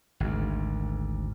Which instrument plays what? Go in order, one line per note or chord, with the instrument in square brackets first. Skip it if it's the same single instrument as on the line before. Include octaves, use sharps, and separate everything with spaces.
[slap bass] G#1 D2